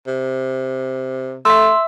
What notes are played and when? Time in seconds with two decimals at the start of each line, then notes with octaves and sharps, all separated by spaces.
0.07 C3
1.45 A3 E5 C6 E6